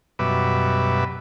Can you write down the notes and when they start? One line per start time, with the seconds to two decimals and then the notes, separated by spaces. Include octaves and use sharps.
0.19 F#2 B2 G3 B4 E5 D6